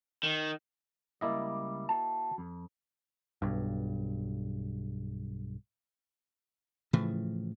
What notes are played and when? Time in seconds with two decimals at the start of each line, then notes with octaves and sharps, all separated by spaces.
0.23 D#3
1.21 C#2 G3 A#3 E4 D5 D#5
1.89 F#4 A5
2.38 F2
3.42 B1 G2
6.93 A2 C#3 E3 F3